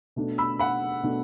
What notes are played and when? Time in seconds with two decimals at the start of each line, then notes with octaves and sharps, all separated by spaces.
0.16 B2 A3 D4
0.38 B5 E6
0.59 F#5 B5
1.03 B2 A3 D4